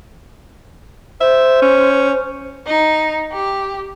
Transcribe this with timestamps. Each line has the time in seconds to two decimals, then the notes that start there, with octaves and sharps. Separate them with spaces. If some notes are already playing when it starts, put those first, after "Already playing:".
1.21 C5 E5
1.62 C#4
2.67 D#4
3.33 G4